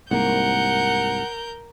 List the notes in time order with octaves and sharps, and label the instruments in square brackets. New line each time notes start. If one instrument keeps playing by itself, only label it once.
[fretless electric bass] C2 G#2 A#3 [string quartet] A#4 G6 [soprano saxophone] F#5